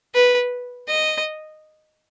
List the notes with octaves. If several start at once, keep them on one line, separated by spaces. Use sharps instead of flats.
B4
D#5